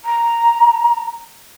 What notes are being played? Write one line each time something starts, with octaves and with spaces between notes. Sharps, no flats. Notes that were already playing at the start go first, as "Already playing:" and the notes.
A#5